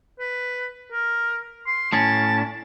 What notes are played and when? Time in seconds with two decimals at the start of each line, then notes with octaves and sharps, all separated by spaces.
0.19 B4
0.92 A#4
1.66 C6
1.93 A2 C#4 A5